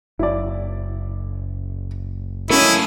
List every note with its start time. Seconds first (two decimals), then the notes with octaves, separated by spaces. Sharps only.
0.19 F#1 E4 D5
2.50 A3 A#3 C#4 E4 D#5